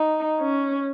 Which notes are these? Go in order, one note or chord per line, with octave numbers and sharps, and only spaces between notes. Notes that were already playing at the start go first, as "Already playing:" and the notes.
Already playing: D#4
C#4